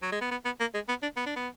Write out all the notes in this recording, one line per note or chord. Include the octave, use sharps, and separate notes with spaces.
F#3
G#3
B3
B3
B3
A#3
G#3
B3
D4
B3
D4
B3